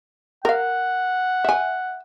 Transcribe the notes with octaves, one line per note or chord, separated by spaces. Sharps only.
A#4 F5 F#5
E5 G#5